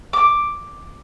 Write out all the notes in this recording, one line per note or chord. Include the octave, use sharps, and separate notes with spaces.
D6